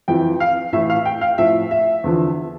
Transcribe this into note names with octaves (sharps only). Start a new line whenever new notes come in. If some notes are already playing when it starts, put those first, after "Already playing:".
F2 E3 G5
F5
A2 E3 E5
F5
G5
F5
A2 F3 E5
E5
E2 D3 F3